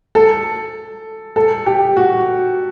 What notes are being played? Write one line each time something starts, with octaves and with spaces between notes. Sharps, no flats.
A4
A4
G4
F#4